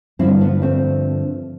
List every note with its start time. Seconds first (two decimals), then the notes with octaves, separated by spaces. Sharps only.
0.19 G2 D3 F3 C4 E4
0.40 B3 D4
0.62 A3 C4